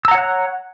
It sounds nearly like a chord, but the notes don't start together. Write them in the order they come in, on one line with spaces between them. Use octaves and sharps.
E6 A#5 F#5 C#5 F#6